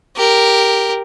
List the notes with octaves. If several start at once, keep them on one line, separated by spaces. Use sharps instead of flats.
G4 A#4